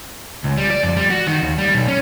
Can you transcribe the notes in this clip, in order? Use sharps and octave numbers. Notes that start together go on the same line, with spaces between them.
C#2
G3
D5
F2
G3
F#4
D#3
D#2
G3
B1
C#4